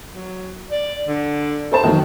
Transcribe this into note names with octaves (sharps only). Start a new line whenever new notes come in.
F#3
D5
D3
A4 C5 A5
D#3 E3 F#3 F#4